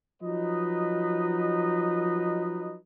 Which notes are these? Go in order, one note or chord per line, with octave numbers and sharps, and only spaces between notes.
F3 F#3 D#4 B4 D#5